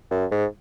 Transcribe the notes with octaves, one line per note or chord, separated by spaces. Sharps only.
F#2
G#2